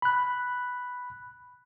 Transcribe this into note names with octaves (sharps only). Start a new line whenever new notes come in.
B5 F#6